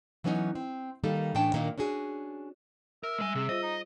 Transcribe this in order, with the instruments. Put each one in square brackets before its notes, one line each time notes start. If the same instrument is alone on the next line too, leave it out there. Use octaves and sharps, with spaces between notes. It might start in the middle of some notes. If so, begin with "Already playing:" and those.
[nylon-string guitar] E3 F#3 B3 C#4 D#4
C4
D#3 G3 A#3 D#4 A4
A2 E3 C#4 D4 G5 A5
A#2 D#3 A#3 D4 D#4
C#4 D4 F#4 G#4
[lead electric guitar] A#4 [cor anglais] E5
[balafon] G3 [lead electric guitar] G#3 G#5
[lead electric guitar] C3 [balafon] G#4
[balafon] F4 C5 [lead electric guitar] D#5
[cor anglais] D#4